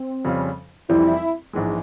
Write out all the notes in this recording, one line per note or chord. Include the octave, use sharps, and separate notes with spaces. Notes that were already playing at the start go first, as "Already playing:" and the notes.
Already playing: C4
F2 C#3 G3 C#4 F4
F1 F2 E3 G3 C4 E4
A#1 G#2 E3 G#3